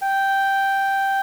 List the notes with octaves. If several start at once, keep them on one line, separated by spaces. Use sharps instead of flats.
G5